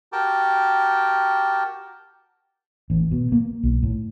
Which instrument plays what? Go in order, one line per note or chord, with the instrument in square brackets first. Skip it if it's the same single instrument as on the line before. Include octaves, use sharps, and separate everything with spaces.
[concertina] F#4 G4 A#4 G5 A5 D6
[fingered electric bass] A1
B2
A#3
B1
A2